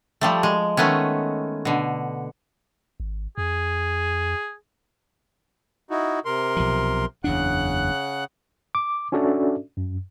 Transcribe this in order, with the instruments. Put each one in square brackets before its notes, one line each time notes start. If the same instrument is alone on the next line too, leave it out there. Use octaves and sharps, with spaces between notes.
[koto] F3 G3 A3
G#3
D#3 G#3 A3 B3 C#4
B2 D3
[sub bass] G#1
[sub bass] F2 [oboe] G#4
[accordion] D#4 E4 F#4
C3 A#4 C6
[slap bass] B1 F3
[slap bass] F#1 E2 D4 [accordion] C#3 F#5 F#6
[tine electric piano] D6
C#4 D4 F#4 A4 D5 E5
F#2